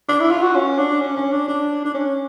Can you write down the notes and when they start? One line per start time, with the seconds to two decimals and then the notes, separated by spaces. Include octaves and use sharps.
0.09 D4
0.20 E4
0.31 F4
0.43 F#4
0.55 C#4
0.78 D4
1.02 C#4
1.17 C#4
1.32 D4
1.48 D4
1.85 D4
1.95 C#4